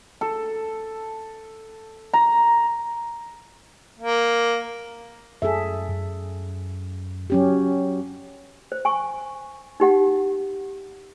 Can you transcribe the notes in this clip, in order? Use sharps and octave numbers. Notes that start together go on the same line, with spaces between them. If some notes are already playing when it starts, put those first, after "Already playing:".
A4
A#5
A#3
F#2 G#4 A4 E5
F#2
F#3 C#4 G4
C5
G#5 C#6
D#4 G4 F#5